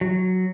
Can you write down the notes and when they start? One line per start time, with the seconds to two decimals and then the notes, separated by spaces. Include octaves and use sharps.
0.01 F#3